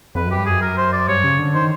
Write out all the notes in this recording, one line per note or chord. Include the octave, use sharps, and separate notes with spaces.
F2 B4
F#2 G4
G2
F#2 G#4
A#4
C5
D5
G2 C#5
C#3
D3
D#3 C5